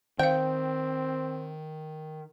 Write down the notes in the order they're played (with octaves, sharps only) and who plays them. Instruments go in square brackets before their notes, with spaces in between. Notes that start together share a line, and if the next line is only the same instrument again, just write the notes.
[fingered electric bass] D#3 [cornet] C4 [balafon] C5 F5 [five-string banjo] G5